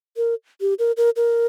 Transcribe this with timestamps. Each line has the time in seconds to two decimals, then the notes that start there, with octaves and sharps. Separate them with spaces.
0.17 A#4
0.61 G4
0.79 A#4
0.97 A#4
1.16 A#4